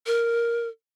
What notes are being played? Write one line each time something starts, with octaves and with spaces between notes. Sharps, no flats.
A#4